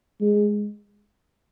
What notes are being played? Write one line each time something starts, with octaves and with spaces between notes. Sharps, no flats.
G#3